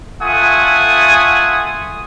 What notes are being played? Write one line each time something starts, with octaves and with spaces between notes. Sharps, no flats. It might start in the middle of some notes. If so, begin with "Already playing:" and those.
A3 F4 F#5 G#5 D#6